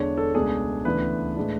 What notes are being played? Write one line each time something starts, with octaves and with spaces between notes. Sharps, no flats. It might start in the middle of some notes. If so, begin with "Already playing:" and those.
Already playing: E2 D3 G#3 D4 C#5
A4
C#2 B2 A3 D4 G#4
D2 C#3 E3 B3 D4 B4
A2 G#3 D4